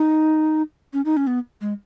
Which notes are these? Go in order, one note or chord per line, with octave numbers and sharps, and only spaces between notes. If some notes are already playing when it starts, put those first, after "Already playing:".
Already playing: D#4
C#4
D#4
C#4
B3
G#3